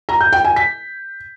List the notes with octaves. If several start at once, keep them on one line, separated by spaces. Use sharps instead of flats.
A#5
G6
G5
G#5
B6